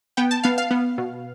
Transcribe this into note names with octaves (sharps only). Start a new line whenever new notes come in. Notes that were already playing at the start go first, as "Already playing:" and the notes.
B3 G5
A5
B3 F5
F5
B3
B2